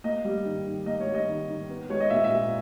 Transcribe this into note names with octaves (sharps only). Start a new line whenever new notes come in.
A#3 D#5
G3
D#3
D#3
A#3 D#5
C#5
G3
D#5
D#3
D#3
B3
G#3 C#5
D#5
A#2 E5
E5
A#2